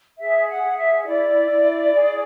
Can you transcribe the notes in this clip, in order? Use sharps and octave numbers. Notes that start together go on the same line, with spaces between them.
G#4 E5
F#5
G#4
E5
E4 D5
E4
G#4